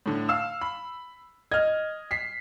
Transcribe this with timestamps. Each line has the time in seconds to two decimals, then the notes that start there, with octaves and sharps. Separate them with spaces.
0.06 A2 D3
0.29 F5 E6 E7
0.61 B5
1.51 D#5 F6 G#6
2.11 B6 C7